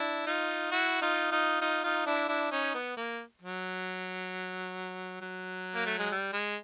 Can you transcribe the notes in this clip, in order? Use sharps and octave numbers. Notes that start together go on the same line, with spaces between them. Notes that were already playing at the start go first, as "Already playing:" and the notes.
Already playing: D4 E4
D#4 F4
E4 F#4
D#4 F4
D#4 F4
D#4 F4
D#4 F4
D4 E4
D4 E4
C#4 D#4
B3
A#3
F#3
F#3
A#3
A3
G#3
G3
G#3